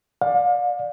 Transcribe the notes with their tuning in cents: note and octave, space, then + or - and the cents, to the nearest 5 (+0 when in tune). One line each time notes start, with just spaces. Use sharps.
D5 +10 F5 +40